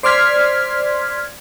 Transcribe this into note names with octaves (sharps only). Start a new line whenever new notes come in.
C5 D5 C6 F6 G#6 B6